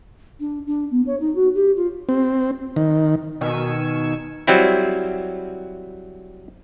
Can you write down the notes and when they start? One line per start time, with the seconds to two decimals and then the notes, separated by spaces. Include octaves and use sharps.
0.40 D4
0.66 D4
0.91 B3
1.06 C#5
1.20 D#4
1.35 F#4
1.54 G4
1.76 F4
2.09 C4
2.76 D#3
3.41 B2 D#3 G#5 C#6 E6
4.47 F#3 G3 C4 E4